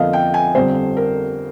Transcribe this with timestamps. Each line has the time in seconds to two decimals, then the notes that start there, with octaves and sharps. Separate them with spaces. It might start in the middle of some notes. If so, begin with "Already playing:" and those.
Already playing: F2 D3 F3 A#3 D#5 F5
0.13 G5
0.34 G#5
0.55 G1 F2 D3 G3 C4 C5
0.97 A#4